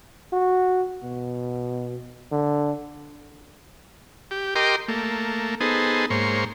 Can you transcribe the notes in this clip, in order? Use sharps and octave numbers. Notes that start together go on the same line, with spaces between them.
F#4
B2
D3
G4
G4 A#4 D#5 G5 C6 D6
A3 A#3
B3 D#4 G#4 A4 C5
G#2 A#3 C5 C#5